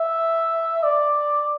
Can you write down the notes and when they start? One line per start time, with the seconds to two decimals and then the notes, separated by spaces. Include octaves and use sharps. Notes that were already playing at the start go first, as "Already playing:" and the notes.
Already playing: E5
0.83 D5